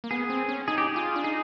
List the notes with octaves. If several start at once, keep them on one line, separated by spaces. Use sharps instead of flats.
A#3
B3 G#4
C4
C#4
D#4 G#4
G4
G#4
F4
D4
D#4 G#4